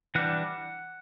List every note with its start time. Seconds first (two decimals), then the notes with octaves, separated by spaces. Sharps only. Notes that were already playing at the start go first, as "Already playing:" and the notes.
0.15 E3 G3 D4 F#5